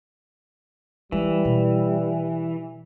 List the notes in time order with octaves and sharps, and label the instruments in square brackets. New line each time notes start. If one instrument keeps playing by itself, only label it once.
[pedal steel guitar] E3 [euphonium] G3 [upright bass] G#3
[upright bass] B2